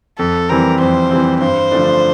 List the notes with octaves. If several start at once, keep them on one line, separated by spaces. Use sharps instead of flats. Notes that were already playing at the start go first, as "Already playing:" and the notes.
F2 A4
E3 G3 C4 A#4
F2 C5
E3 G3 C4
G2 C5
D3 F3 A3 D4